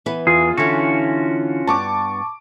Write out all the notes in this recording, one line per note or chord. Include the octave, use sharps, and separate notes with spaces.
E3 B3 B4
E2 F4 G#4
D3 E3 C#4 F#4
G2 B3 A5 C#6 D6